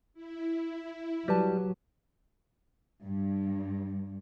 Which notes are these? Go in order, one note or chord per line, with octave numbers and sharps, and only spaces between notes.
E4
F#3 G3 G4 B4 A5
G2